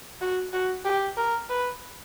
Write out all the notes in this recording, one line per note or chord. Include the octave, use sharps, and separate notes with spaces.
F#4
F#4
G4
A#4
B4